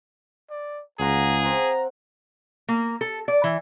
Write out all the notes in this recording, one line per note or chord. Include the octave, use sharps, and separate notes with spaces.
D5
C#2 G#4 F5 F#5 A#5 C6
C4 F#5 A#5
A#3
A4
D5
E3